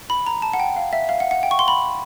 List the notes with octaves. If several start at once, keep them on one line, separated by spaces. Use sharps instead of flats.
B5
A#5
A5
F#5
G5
F5
E5
F5
F#5
F#5
G5
C#6
C6
B5